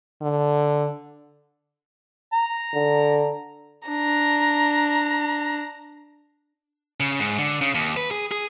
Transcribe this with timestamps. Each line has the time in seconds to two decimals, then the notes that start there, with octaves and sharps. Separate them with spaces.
0.22 D3
2.33 A#5
2.74 D3
3.88 D4 A#5
7.00 C#3
7.20 G#2
7.39 D3
7.61 C#3
7.75 D#2
7.97 B4
8.11 G#4
8.31 G#4